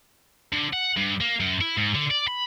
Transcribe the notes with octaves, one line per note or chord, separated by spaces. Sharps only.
D3
F#5
G2
A#3
F#2
E4
G#2
D3
D5
B5